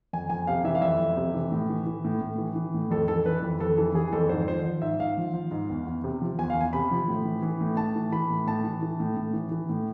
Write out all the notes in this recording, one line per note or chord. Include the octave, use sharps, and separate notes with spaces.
F2 G#5
F2 G#5
C3 F5
E3 E5
F5
F2 E5
F2
C3
E3
A2
E3
E3
A2
A2
E3
E3
A2
F2 A4
E3 A4
E3 B4
F2
F2 A4
E3 A4
E3 G#4
F2 A4
G#2 C5
F3 C5
F3
G#2 E5
G#2 F5
F3
F3
G#2
E2
E2
C3
F3
E2 G#5
F5
E2 G#5
C3 B5
F3
A2
E3
E3
A2
A2 A5
E3
E3 B5
A2
A2 A5
E3
E3
A2
A2
E3
E3
A2